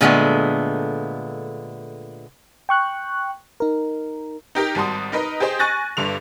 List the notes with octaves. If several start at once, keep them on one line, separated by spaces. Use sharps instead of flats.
A#2 D3 G#3 A3 B3
G5 C#6 F#6
D#4 A#4
D#4 G4 A#4
G#1 G3 F#4 A5 C6 D#6
D#4 A#4 B4 D#5
G4 G#4 C5 D#5
G#5 C#6 F#6 A6 A#6
G1 G2 D3 F7